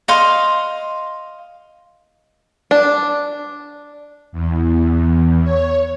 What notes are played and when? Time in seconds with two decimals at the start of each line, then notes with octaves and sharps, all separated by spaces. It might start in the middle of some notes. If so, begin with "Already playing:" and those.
0.08 D#5 F5 C6
2.71 D4
4.32 E2
5.43 C#5